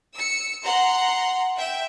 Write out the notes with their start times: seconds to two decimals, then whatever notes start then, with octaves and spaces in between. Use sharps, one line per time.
0.14 E6 C#7
0.63 F#5 A#5 C6
1.57 E5 G5